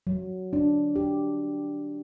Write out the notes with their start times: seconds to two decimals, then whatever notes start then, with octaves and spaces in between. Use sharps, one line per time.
0.07 F#3
0.53 D4
0.96 G4